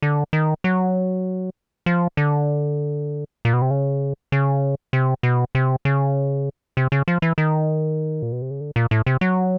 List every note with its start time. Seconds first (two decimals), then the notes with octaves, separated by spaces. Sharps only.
0.02 D3
0.33 D#3
0.64 F#3
1.86 F3
2.17 D3
3.45 A#2
3.53 B2
3.62 C3
3.71 C#3
4.32 C#3
4.93 C3
5.23 B2
5.55 C3
5.85 C#3
6.77 C3
6.92 C#3
7.08 F3
7.22 E3
7.38 D#3
8.23 A#2
8.32 B2
8.42 C3
8.51 C#3
8.61 D3
8.76 A#2
8.91 A2
9.06 C3
9.21 F#3